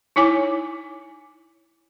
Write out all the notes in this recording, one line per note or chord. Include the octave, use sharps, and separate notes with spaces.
D#4 E4 C#5 G#5 D6